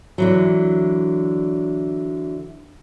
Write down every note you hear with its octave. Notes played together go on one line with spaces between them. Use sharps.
D3 E3 F#3